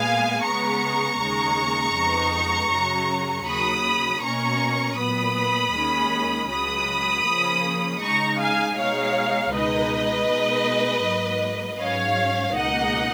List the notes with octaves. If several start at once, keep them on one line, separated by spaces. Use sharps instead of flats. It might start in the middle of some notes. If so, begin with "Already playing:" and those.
Already playing: A#2 G#3 B3 F5 G#5
C#3 G#3 B3 A#5 C#6
D#2 C#3 G#3
F2 C#3 G#3 B3 D#4
F#2 C#3 F#3 C#4
D#2 C#3 F#3 B5 D#6
B2 A#3 C#4 A#5 C#6
A#2 F#3 B3 B5 D#6
D#2 D#3 G#3 C#4
C#2 C#3 F#3 B5 D#6
C#3 F3 A#3 C#4
C#3 G#3 D#4 A#5 C#6
F5 G#5
B2 G#3 D#4 C#5 F5
C#2 B2 G#3 D#4 B4 D#5
B2 G#3 B3 D#4
G#2 F#3 A#3
G#2 F#3 C#4 C#5 F5
C#2 B2 A#3 D#4 D#5 F#5